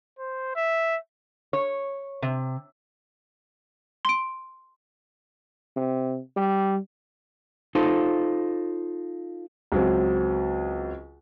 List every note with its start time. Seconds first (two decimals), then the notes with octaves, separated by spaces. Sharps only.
0.19 C5
0.56 E5
1.53 C#5
2.22 C3
4.05 C6 D7
5.76 C3
6.36 G3
7.75 D#4 F4 A4 C5
9.72 C#2 F#3 C4